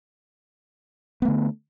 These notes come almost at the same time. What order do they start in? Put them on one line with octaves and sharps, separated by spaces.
B3 A3 D3